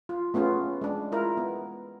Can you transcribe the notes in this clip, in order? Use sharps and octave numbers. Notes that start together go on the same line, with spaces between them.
F4
A3 B3 C#4 F4 G#4
G#3 D4
G#3 E4 F4 A#4
B3